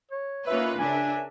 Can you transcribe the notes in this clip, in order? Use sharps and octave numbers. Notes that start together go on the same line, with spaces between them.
C#5
A#3 C#4 D#4 F4 B4 C#5 E5
C#3 D4 A#4 E5 G#5